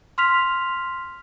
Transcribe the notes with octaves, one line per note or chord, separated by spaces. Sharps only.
C6 F6 B6 F7